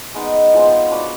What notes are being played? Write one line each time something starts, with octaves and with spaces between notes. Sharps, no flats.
G#3 B3 D#4
F3 G#3 B3
D4 F#4 B4 D5